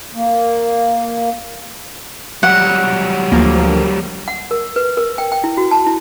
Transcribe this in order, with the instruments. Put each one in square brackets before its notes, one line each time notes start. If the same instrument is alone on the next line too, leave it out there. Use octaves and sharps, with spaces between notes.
[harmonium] A#3
[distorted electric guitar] F#3 G3 [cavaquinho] F#5
[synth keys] D2 F3 A#3
[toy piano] F#5
A#4
B4
A#4
G5
G5
E4
F#4
A5
E4